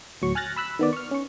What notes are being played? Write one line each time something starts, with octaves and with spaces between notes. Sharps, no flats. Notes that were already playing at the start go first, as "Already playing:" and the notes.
D2 A2 F#3 C#6
G#5 F6 F#6 A6 A#6
B5 E6 F#6 B6
D#3 B3 D5
C#6 F6
C#4 C#6